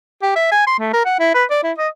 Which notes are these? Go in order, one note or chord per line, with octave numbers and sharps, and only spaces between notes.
G4
E5
G#5
C6
A3
A#4
F#5
E4
B4
D5
E4
D#5